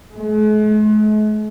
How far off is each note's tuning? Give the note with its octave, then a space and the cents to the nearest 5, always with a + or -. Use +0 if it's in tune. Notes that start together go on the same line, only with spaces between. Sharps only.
G#3 +45